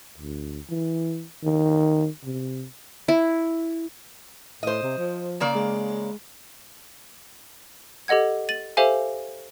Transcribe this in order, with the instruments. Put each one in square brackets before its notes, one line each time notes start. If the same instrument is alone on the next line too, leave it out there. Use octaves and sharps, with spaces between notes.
[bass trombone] D2
E3
D#3
C3
[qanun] E4
[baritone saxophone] A2 [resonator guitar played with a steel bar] C5 D#5
[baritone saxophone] C3
F3
[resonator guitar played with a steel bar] C#3 A#3 D5
[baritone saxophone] G#3
[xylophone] G4 A4 D#5 F#5 G#6
A6 D#7 F#7
G4 A4 C5 E5 F5 G#5